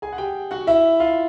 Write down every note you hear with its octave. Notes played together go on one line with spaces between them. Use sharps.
G#4 G#5
F#5
G4 G5
F#4 F#5
E4 E5
F4 F5